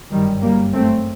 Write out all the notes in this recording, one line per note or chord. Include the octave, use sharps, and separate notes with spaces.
G1 F#2 D#3 G3
G3 A#3
A3 C4